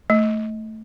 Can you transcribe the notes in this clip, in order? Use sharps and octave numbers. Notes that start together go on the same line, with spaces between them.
A3